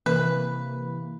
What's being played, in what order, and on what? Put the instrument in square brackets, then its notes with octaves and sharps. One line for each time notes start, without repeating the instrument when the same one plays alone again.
[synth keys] C3 E3 A#3 [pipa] B4